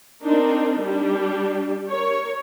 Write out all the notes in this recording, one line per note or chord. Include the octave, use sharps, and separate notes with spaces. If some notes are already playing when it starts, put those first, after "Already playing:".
C4 D4 D#4 A#4
G3 D4 G4
A#4 C#5